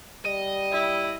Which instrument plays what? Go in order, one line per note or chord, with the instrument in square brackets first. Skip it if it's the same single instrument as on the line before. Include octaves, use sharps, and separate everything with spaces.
[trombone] G3 [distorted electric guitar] D#5
[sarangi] E4